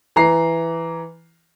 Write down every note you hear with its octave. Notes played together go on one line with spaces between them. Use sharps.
E3 A#5 C7